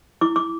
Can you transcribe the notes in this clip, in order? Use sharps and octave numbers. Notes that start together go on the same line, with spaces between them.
E4 D6
D6